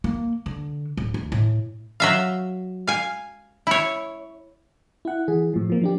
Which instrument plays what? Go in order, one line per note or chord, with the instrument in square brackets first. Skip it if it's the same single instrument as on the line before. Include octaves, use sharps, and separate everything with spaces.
[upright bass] A#3
D3
D1
D2
A2
[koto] F#3 E5 F5
F5 G#5
E4 C#5
[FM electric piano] E4 F#5
E3 G#4
A2 F3
F3 A#3
F3 D4 G4